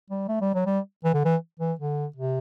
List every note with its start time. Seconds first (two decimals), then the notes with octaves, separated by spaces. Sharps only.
0.10 G3
0.28 A3
0.41 G3
0.54 F#3
0.66 G3
1.04 E3
1.14 D3
1.25 E3
1.60 E3
1.79 D3
2.16 C3